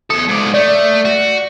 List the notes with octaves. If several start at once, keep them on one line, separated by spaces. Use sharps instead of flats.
E2 A4 D#6
G#2 D5
A3 D5
F#4